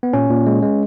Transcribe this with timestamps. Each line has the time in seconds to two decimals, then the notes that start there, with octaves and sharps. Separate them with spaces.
0.03 B3
0.13 A#2 C#4
0.30 A#2
0.46 G#3
0.63 G#3